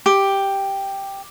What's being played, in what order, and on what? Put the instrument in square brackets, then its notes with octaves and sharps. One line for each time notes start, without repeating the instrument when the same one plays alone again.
[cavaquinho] G4